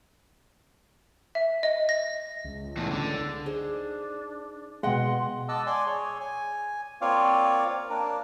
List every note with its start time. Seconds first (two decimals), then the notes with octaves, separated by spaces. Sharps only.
1.35 E5
1.63 D#5
1.89 A#6
2.45 C#2
2.77 E2 A2
2.92 D3
3.46 D4 D#4 G#4 C5
4.83 B2 G#3 D#5 F#5 G5 C6
5.49 D#5 F#5 A5 D6 E6
5.67 D5 G#5 C6
5.86 G#4 C#5
6.20 G#5
7.01 A#3 C4 F4 C#5 D5 F5
7.90 A#3 D4 A#4